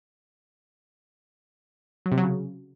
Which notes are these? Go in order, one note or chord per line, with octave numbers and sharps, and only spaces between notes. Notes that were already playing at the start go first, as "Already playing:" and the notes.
F#3
C3
F#3
C#3